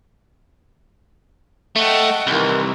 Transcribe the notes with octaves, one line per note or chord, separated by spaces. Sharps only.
A3 D#5 F#5 G5
C2 D#3 E3